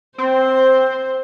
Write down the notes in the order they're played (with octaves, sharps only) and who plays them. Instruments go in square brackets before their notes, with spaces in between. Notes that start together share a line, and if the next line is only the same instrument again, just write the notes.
[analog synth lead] C4 [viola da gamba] C5